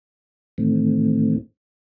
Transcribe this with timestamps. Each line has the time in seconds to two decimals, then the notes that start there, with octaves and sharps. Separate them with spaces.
0.58 A2 D#3 E3 A3 C4